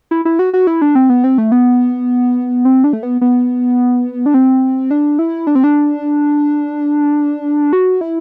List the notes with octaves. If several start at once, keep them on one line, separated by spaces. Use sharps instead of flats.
E4
E4
F#4
F#4
E4
D4
C4
B3
C4
A3
B3
C4
D4
A3
B3
B3
D4
C4
D4
E4
D4
C4
D4
F#4
E4